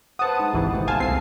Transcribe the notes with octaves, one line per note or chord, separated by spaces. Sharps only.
B4 C5 F#5 A5 D#6
G#3 D#4
G#1 C#2 E3 G4
B2 A3 C5
F5 G#5 A5
C2 C4 C7